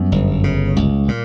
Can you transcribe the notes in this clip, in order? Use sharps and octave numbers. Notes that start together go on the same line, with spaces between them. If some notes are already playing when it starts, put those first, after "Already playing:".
Already playing: F#2 G3 B3
G1
C#3
C#2
A#2